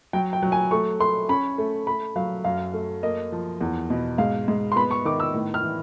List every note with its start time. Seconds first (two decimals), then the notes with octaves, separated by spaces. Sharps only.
0.13 F#3 G5
0.33 G5
0.43 F#3
0.52 G#5
0.71 A3 C#6
1.00 A3 C6
1.29 C#4 B5
1.58 A3
1.87 A3 B5
2.16 F#3 F5
2.44 F#2 F5
2.74 A3
3.03 A#3 D#5
3.32 F3
3.61 E2
3.90 B2
4.18 G#2 F5
4.48 G#2
4.72 C6
4.76 B3 B5
4.91 C#6
5.05 D#3 D6
5.20 E6
5.34 A2
5.54 F6
5.64 E3